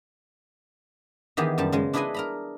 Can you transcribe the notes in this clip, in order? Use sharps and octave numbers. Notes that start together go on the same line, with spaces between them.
D#3 E3 B3 G4 G#4
F#2 G3 A5
C#3 G#3
D4 E4 G#4 B4 D#5 G#5
A#4 A#5 B5